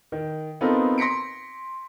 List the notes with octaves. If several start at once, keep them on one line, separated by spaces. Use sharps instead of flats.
D#3
B3 C4 D#4 F4 A4 A#4
C6 A#6 B6 C#7 D7